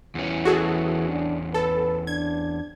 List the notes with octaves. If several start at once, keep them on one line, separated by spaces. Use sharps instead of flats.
E2 E3 C#4
F#4 G#4 A4
D4
A4 B4
D4 G#6